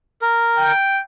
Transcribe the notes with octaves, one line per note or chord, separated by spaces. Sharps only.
A#4
G5